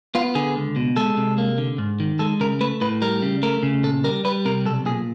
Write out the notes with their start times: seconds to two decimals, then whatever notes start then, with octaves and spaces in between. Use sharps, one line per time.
0.15 B3 F4
0.35 D3 G#4
0.56 C#2
0.76 B2
0.97 G#3 A4
1.17 C3
1.38 A#3
1.58 D3
1.78 G#2
2.00 D#3
2.19 G#3 A4
2.40 C#3 A#4
2.61 A3 B4
2.81 A2 B4
3.02 G3 A#4
3.22 C#3
3.43 A3 A#4
3.63 C#3
3.84 A#2 A4
4.04 G3 A#4
4.25 G3 B4
4.45 C3 A#4
4.66 B1 A4
4.86 A#2 G#4